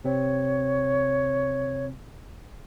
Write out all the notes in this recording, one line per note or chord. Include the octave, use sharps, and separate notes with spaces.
C3 C4 C#5